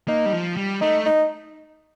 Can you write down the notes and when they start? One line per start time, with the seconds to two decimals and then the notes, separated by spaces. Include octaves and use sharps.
0.08 A#3 D#4
0.26 G3
0.33 F3
0.57 G3
0.81 A3 D#4
1.06 D#4